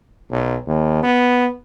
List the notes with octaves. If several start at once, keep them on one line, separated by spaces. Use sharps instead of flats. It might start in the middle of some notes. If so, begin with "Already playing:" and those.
B1
D#2
B3